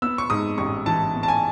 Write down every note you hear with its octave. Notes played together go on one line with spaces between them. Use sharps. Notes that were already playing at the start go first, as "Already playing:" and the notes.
B3 E6
C#6
G#2 D#6
A1 C#6
E3 A5
B3
A5
G#5